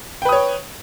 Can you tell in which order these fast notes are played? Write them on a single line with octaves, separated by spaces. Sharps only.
G5 B4 D#6 C#5